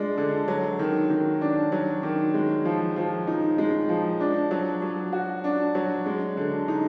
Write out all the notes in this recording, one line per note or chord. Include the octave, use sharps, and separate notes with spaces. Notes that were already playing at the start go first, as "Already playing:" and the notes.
Already playing: G#3 D4 F4
D3
F#3
D#3
D#3
D4
F#3
D#3
G#3
F3
F3
D#4
G#3
F3
D4
F#3
F#3
F#4
D4
F#3
G#3
D3
D#4